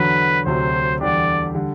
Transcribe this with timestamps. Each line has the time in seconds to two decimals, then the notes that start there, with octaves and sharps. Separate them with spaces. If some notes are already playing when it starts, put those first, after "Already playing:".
Already playing: E2 D3 F#3 B4
0.46 D2 C3 F#3 C5
1.00 E2 D3 G3 D4 G4 D5
1.55 D3 G3